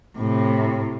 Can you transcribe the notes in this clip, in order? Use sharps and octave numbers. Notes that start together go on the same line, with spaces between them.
A2 C3